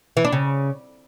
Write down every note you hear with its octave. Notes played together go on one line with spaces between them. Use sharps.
E3
D4
C#3